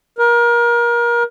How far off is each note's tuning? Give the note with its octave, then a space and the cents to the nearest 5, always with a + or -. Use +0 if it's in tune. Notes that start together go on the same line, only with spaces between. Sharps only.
A#4 +30